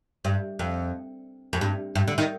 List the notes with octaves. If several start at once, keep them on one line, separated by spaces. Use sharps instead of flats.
G2
F2
F2
G2
G2
D3
D#3